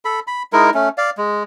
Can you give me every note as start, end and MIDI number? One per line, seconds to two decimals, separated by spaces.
0.05 0.20 69
0.05 0.20 83
0.27 0.43 83
0.53 0.70 56
0.53 0.70 63
0.53 0.70 64
0.53 0.70 70
0.74 0.89 57
0.74 0.89 61
0.98 1.10 74
0.98 1.10 77
1.17 1.43 56